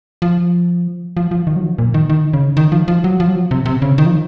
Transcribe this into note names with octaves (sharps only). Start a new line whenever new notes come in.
F3
F3
F3
D#3
F#3
F3
A#2
D#3
D#3
C#3
D#3
F3
F3
F#3
F3
F#3
F3
C3
C3
C#3
D#3
F3